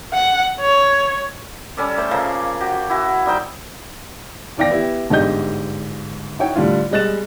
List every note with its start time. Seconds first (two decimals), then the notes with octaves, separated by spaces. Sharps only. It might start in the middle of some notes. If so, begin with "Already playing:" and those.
0.13 F#5
0.60 C#5
1.77 G3 C#4 A4 D5
1.97 A3 C5 C#5
2.11 C#3 F3 A#3
2.60 F#4 G4
2.90 E4 F#4 G#5
3.26 G3 D#4 C5 G5
4.57 E2 D#3 D5 F5 G5 A#6
4.71 B3 E4 G4
5.10 G1 G#2 D3 G4 D#5 G6
6.39 D#4 E4 F#4 C#5 G5
6.56 A2 D3 G3 D4 F4
6.91 G3 G#3 D#5 F#6 A6 E7